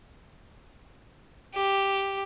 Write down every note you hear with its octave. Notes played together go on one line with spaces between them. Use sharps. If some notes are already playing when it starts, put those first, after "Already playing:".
G4